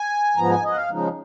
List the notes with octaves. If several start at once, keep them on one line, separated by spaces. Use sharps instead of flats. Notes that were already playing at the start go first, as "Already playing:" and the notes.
Already playing: G#5
G#2 F3 B3 A#5
G#5
D#5
F#5
F5
C#3 F3 G#3 D#4